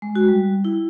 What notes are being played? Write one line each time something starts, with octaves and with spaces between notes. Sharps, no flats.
G#3
F#4
G3
E4